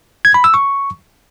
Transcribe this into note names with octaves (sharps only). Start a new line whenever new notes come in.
G#6
B5
E6
C#6